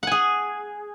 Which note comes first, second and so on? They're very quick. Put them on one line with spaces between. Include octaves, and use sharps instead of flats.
F#5 G#5 G#4